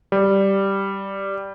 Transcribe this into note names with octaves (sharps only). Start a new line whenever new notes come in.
G3